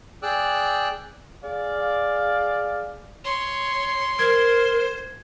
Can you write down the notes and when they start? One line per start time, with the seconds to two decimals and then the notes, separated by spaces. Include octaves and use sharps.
0.23 G#4 D5 G5 D6 E6 F#6
1.44 G#4 D5 F5
3.24 C#5 C6
4.19 A#4 C5 G#6